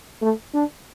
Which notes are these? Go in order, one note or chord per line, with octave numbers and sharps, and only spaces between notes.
A3
D4